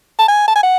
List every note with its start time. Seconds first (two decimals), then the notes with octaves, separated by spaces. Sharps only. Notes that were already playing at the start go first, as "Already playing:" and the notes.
0.19 A5
0.28 G#5
0.48 A5
0.56 G#5
0.63 F#5